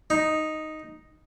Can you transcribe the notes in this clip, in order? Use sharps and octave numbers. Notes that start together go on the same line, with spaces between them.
D#4